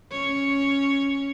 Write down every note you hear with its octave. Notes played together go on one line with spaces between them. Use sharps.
C#4 C#5